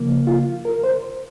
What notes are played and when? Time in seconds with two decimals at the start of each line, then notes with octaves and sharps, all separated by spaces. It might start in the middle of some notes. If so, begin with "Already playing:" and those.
Already playing: C#3 F3 A#3
0.27 F4
0.65 A#4
0.84 C5